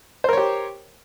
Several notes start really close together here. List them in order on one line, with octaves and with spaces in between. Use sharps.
C5 A#4 C#5 G4